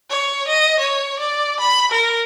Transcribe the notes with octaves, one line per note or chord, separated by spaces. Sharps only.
C#5
D#5
C#5
D5
B5
A#4